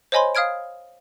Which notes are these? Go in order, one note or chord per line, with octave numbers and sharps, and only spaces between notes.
C5 C#5 D#5 G#5 B5 C6
F5 D#6 F6 G#6 D7